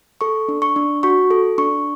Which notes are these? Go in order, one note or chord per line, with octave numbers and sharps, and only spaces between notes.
A4 C#6
D4
C#6
D4
F#4 C#6
A4
D4 C#6